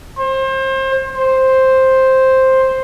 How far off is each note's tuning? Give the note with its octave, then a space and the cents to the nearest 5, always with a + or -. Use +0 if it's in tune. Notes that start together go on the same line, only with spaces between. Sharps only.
C5 +30
C5 +5